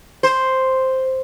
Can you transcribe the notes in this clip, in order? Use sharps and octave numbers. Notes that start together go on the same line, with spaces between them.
C5